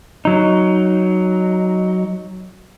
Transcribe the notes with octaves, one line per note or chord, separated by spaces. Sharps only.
F#3 D#4